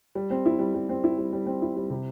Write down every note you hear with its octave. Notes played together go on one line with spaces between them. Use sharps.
G3
C4
E4
G3
G3
C4
E4
G3
G3
C4
E4
G3
C3